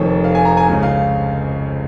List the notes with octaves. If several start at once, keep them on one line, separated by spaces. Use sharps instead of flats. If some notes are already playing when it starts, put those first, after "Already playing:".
Already playing: F1 F2 D#3 C#5
F5
G#5
A#5
G#5
C#2 C#3
F5